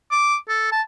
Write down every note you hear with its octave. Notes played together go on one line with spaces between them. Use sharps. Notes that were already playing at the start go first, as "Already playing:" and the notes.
D6
A4
A5